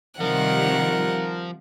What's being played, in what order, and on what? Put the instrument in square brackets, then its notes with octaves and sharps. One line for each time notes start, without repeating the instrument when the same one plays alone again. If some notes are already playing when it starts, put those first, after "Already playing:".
[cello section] C3 D#3 G3 [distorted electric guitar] F3 [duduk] A#4 [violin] F#5